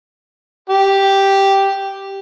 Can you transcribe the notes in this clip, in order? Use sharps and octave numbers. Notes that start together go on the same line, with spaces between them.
G4